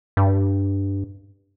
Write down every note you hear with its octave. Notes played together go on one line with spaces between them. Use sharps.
G2